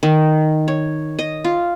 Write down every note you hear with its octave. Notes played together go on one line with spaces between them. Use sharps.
D#3
C#5
D#5
F4